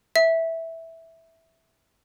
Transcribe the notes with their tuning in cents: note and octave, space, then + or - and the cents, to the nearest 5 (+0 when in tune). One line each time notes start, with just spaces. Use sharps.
E5 -5